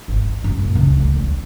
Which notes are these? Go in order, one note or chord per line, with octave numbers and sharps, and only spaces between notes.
G#1
D#4
F#2
A#2
C#2
D2
E2